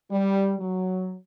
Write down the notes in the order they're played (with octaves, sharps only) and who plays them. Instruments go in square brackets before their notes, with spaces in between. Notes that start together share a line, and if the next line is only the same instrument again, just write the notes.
[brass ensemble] G3
F#3